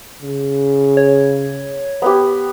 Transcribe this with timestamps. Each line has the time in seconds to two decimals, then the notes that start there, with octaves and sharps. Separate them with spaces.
0.22 C#3
0.97 C#5
2.02 B3 G4